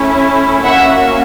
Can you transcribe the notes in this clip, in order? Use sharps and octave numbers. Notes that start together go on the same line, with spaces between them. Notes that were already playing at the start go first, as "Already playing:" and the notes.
Already playing: A3 C#4 E4
A#3 C#4 F#4 E5 F#5